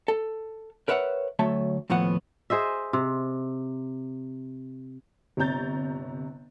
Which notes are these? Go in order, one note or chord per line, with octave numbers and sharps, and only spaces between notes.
A4
A#4 B4 C#5 E5 F#5
D2 F#3 A3 C#5 E5 A5
D#2 A2 F3 B3 F#5
G#4 C5 D#5 E5
C3
G1 C3 C#5 A#5 G6 A6